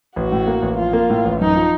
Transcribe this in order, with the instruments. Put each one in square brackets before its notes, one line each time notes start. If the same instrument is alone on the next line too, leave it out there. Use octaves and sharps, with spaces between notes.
[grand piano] A1 [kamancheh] F#4
[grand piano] A2
A#3
A1
[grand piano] F3 [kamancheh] F4
[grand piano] A#3
A2
A1
[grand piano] F#2 [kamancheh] D#4
[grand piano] F3